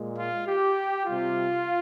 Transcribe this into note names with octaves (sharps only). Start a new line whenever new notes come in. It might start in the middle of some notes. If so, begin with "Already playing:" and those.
Already playing: A#2 G#3
F4
G4
C3 G3 F4